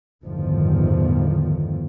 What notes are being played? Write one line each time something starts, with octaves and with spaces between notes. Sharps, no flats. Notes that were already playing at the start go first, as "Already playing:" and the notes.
G1 E2 A2 D3 D#3 F3